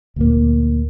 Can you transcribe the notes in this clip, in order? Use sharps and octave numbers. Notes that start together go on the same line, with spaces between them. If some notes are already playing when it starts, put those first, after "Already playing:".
D2 A#2 A#3